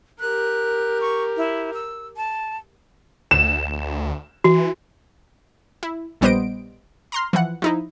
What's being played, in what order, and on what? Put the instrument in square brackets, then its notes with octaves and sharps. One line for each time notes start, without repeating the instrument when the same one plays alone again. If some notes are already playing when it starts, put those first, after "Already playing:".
[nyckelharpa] G4 A#4 [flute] F#6
[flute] C#6
E4
E6
A5
[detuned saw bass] D2 [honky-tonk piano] E7
[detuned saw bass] E3 [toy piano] F#4
[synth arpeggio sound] E4
A#1 G3 B3 C5 D#5 D7
A#5 C6 F6
E3 F3 F#5
F3 D#4 E4